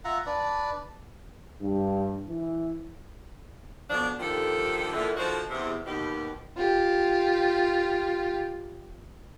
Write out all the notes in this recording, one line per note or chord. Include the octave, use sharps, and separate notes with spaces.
F4 E5 F#5 A#5
D4 B4 D5
G2
E3
F2 B2 F3 D4
D#2 D3 D#3 F3 G4 A4
A#2 D3 E3
D3 F3 D#4 F#4 A#4 C5
E2 C3
D#2 B2 G4
F4 G4